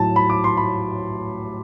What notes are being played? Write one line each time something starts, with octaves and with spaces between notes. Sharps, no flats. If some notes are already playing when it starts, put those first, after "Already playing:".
Already playing: A2 F#3 A5
B5
D6
C6
B5